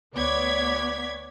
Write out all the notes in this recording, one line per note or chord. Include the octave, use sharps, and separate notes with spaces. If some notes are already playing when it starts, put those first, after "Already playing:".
D2 B3 C#5 D5 G#6 B6